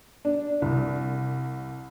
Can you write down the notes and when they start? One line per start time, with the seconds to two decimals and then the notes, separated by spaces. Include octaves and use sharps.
0.25 D4
0.62 C2